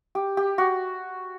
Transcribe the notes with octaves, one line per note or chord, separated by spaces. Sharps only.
G4
G4
F#4